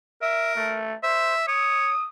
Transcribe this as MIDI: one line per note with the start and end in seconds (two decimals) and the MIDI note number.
0.22 0.78 70
0.22 0.55 76
0.56 0.95 57
1.03 1.35 72
1.03 1.47 76
1.48 1.90 73
1.48 2.09 87